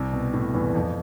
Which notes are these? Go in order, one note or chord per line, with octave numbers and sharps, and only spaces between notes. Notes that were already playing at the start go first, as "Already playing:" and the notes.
Already playing: C2 C3
B2
A2
E2 E3
F2 F3